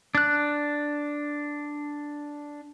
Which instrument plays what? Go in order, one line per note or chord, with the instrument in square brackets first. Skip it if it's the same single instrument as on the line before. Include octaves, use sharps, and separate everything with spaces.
[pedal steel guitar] D4 F#6